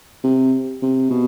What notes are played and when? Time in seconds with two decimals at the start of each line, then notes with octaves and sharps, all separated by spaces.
0.24 C3
0.82 C3
1.10 B2